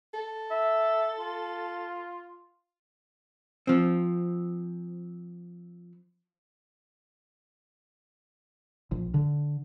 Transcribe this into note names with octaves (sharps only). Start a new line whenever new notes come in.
A4
E5
F4
F3 C4
A#1
D3